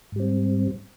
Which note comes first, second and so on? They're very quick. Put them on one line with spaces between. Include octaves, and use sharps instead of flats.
G#2 G3 C4